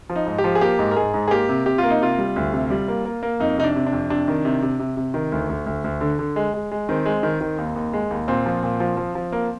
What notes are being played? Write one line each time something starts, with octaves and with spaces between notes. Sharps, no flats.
F3
D#4
G#2
G4
F3
G#4
A#3 G4
G#2
A#4
G#2 G#4
G#2
G#4
A#3 G4
C3
C3 G4
F4
A#3
D#4
C3 F4
G3
D2
C3
G3
A#3
A#3
A#3
F2 D#4
C3 D#4
D4
C3
D4
F2
C3 D4
D#3
C3
C3
C3
C3
D#3
D2
D2
D2
D2
D3
D3
G#3
G#3
G#3
D#3 C4
G#3
D#3
D#3
D#2
D#2
G#3
D#2
A#2 C4
F3
A#2
F3
F3
F3
A#3